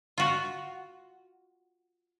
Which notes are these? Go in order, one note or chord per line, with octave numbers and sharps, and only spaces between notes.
F4 F#4